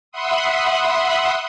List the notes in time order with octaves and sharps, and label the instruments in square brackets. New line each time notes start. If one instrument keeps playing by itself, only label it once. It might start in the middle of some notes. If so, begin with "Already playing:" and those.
[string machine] E5 F#5 B5 C6 D#6